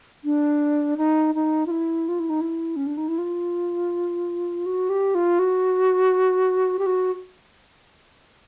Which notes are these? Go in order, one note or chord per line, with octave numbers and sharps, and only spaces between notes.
D4
D#4
D#4
F4
E4
F4
E4
D#4
E4
C#4
D4
D#4
E4
F4
F#4
G4
F4
F#4
G4
F#4